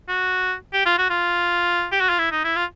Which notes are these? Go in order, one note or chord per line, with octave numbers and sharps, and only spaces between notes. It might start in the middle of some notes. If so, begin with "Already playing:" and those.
F#4
G4
F4
F#4
F4
G4
F#4
F4
E4
D#4
E4
F4